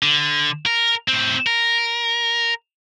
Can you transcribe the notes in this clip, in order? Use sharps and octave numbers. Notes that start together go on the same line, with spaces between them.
D3
A#4
A2 C4
A#4